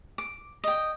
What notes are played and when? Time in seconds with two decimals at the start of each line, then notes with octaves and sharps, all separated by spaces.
0.18 D6
0.64 D#5 G5